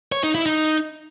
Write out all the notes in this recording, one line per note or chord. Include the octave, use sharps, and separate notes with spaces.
C#5
D#4
E4
D#4